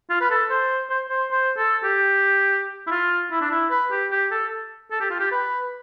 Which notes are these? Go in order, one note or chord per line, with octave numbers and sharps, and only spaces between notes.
F4
B4
A4
C5
C5
C5
C5
A4
G4
E4
F4
E4
D4
E4
B4
G4
G4
A4
A4
G4
F4
G4
B4